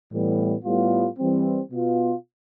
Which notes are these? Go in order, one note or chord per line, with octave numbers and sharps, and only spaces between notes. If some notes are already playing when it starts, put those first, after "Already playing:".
A2 E3 G3 B3
A2 G3 B3 F4
E3 G3 C4
B2 B3 F4